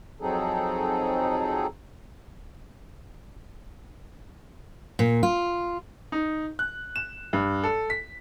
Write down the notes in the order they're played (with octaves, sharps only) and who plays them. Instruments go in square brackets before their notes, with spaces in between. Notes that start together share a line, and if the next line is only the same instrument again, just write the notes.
[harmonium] F2 F#3 C4 D#4 G#4 A4
[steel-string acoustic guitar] A#2
F4
[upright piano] D#4
F#6
E7
G2
A4
B6